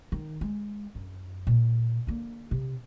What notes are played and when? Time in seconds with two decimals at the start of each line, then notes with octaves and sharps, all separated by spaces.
0.12 D#3
0.41 G#3
0.95 F#2
1.47 A#2
2.07 D3 A#3
2.51 C3